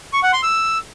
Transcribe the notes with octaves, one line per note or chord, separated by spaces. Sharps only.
C#6
F#5
C6
E6